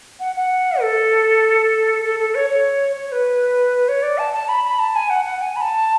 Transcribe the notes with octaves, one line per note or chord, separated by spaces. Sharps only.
F#5
F#5
A4
A4
A4
C#5
C#5
C#5
B4
C#5
D5
A5
A5
B5
B5
A5
G#5
F#5
F#5
G#5
B5
A5